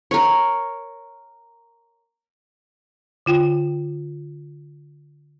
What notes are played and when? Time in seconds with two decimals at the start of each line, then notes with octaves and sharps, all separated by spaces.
0.11 A#4 C#5
3.26 D3 F4 G5